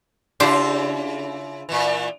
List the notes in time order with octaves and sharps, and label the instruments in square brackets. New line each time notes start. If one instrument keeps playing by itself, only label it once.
[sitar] C#3 E4 F4 [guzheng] D4 G4 C5
[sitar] A#2 E3